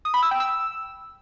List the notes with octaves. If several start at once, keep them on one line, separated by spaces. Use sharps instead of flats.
D#6
B5
E6
G5
E6